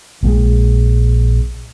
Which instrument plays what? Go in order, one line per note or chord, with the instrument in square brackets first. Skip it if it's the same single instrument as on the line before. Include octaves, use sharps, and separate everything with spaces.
[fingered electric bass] A#1 A#2 F3 G#3